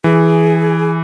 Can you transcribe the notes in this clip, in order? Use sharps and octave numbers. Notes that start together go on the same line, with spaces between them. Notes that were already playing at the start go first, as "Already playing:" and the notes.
E3 G#4